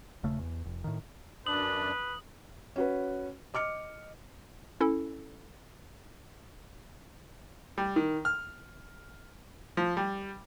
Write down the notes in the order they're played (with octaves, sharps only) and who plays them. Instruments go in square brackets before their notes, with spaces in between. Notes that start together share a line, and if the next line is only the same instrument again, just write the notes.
[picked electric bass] D#1 C#3 A3
E2
F1
A2 D#3
[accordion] F#2 D4 [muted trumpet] B4 [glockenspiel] D#6 F#7
[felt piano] C#4 F#4 B4
D#5 D6 F6 C#7
[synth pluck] C#4 E4 A4
[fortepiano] G3
D#3
F6
F3
G3